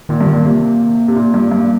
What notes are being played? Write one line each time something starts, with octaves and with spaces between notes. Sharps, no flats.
A#2 D#3
G2
D#3
A#2
C3 A#3
C3
A#2
G2
G2